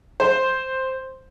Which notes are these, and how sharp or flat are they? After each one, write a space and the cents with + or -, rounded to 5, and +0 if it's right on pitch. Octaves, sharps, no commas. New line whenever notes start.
C5 +5